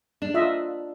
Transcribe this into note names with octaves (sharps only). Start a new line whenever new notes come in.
D4
F4 D#5 E5